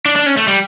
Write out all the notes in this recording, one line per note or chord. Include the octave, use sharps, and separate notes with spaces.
D4
D4
C#4
A3
G3